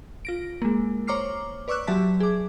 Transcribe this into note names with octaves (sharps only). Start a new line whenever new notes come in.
F4 A#6 D7
G#3 A#3
C5 C#5 A#5 D6 F6 C7
B4 D5 C#6 D6 E6 F#6
F#3 G4 E5 A5 B6
G#4 D6